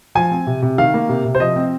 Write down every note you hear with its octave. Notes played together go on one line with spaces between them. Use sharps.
F3 G#5
C4
C3
C3
D#3 F5
A#3
C3
C3
C5
F3 D#5
C4